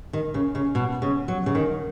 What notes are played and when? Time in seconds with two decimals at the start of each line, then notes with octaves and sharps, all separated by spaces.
0.13 D#3
0.34 C#3
0.55 C#3
0.75 B2
1.02 C#3
1.28 F#3
1.46 C#3
1.55 D#3